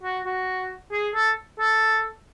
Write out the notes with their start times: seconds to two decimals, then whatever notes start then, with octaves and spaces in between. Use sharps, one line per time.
0.03 F#4
0.25 F#4
0.92 G#4
1.14 A4
1.59 A4